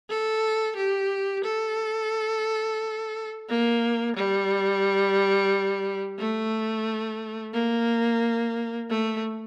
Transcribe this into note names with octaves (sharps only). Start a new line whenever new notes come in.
A4
G4
A4
A#3
G3
A3
A#3
A3